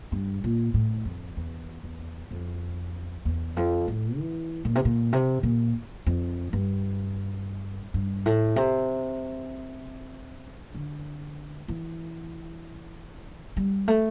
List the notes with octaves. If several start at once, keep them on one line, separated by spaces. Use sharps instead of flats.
G2
A#2
A2
F2
E2
E2
F2
E2
F2
A2
E3
A#2
C3
A#2
C3
A#2
F2
G2
G2
A2
C3
D3
E3
G3
A3